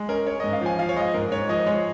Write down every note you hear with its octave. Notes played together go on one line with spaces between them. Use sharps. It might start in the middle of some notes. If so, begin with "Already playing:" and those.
Already playing: G#3
C#4 A#4
C#4 C#5
G#2 D#5
F5
F3 G#5
F3 F5
C#5
G#3 D#5
G#2 A#4
G#2 C#5
F3 D#5
G#3 C#5